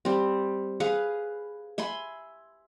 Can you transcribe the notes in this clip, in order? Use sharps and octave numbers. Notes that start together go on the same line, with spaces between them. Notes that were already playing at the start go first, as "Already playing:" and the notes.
G3 C4
G#4 B4 F5
E5 G#5 B5 C6